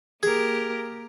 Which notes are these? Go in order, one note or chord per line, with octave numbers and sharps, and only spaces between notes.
A#3 G4 G#4 A#4